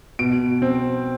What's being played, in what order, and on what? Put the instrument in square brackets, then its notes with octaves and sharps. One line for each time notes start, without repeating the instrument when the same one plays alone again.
[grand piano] B2 D7
C4